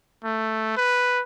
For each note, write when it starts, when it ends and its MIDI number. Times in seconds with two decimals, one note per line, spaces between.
0.24 0.74 57
0.77 1.22 71